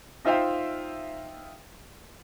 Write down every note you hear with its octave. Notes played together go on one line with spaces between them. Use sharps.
D#4 F4 C5 E5 F5 G5